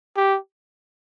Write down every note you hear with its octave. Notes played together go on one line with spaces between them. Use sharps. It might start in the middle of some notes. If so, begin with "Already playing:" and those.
G4